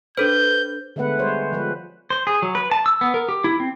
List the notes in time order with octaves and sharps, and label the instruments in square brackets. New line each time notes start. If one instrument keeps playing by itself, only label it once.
[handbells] D4 A4 C5 [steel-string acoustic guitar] B4 [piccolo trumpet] G6
[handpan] D3 G#3 A3 B3 B4 F#5
G3 G#3 C5 C#5
F3 G#3 B4
[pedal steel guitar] C5
G#4
F#3
B4
A5
E6
B3
A#4
G4
E4
C4